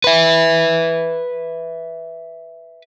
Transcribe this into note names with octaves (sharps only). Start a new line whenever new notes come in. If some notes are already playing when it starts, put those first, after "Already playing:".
B4 E5